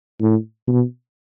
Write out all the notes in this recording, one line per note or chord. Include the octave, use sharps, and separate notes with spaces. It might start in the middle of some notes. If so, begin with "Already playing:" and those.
A2
B2